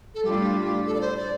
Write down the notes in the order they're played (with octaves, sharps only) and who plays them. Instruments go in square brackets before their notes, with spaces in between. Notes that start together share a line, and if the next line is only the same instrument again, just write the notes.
[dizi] A4
[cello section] A2 G3 D4 F4 [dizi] G4
[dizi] A4
D5
C5
D5